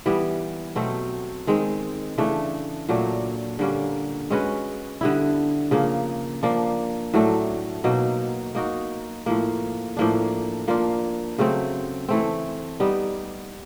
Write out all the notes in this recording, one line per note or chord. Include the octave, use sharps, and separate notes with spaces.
E3 G3 B3
B2 F#3 A3 C4
D#3 G#3 C4
C#3 E3 A3 D4
A#2 F#3 A3 D4
D3 G3 A#3 C#4
G#3 C#4 F#4 B4
D3 G3 B3 E4
C#3 F3 A#3
F3 A#3 D4
A2 F#3 A3 D4
B2 F#3 A#3 D#4
A#3 D#4 F#4 A#4
A2 F3 A#3
A2 F3 A#3 D4
F3 A#3 D4 F4
C#3 F#3 A3 C4
E3 A3 C4
G3 B3 D#4